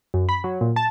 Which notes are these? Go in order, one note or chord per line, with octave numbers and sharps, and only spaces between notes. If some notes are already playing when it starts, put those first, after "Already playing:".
F#2
B5
F#3
A#2
A5